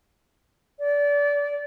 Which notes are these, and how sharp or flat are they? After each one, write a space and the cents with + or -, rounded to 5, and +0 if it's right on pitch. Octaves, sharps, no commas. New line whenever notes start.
D5 -25